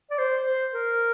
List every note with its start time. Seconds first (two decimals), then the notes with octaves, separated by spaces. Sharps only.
0.11 D5
0.18 C5
0.46 C5
0.74 A#4